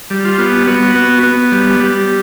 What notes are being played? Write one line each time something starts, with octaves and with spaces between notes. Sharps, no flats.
G3
F4
B3
B3 F#4
B3
B3
G3
G3